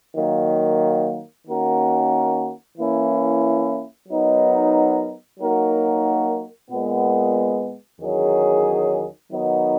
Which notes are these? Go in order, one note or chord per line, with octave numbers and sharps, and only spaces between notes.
D#3 F#3 A#3
D#3 A#3 C#4 F#4 A#4
E3 A#3 C#4 E4
F#3 B3 D#4 A#4
F#3 A#3 D#4 F#4 A#4
A#2 G#3 B3
E2 D#3 F#3 C#4 G#4
D#3 F#3 B3 D#4